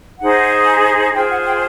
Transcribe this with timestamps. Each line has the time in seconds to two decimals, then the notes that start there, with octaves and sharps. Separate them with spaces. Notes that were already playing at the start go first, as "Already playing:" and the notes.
0.20 D#4 G#4 C5 F#5
1.14 F4 G#4 C5 G5
1.30 F#5
1.46 G5